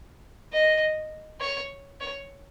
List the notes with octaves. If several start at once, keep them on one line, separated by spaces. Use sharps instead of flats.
D#5
C#5
C#5